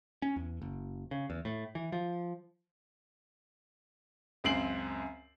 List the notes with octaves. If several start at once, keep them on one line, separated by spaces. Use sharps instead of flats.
C#4
E2
F#1
C#3
E2
A2
E3
F3
C#2 F#2 C4 C7 D7 F#7